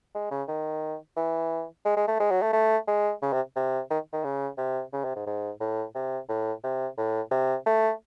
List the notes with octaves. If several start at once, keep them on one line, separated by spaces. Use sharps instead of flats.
G#3
C#3
D#3
E3
G#3
G#3
A3
G#3
F#3
A3
A3
G#3
C#3
C3
C3
D#3
D#3
C#3
C3
C#3
C3
G#2
G#2
A2
C3
A2
C3
A2
C3
A3